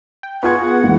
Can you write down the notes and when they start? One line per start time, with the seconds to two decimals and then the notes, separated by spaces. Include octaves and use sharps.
0.23 G5
0.43 B3 F4 G#4 F#5 C#6 G#6
0.84 E3 G#3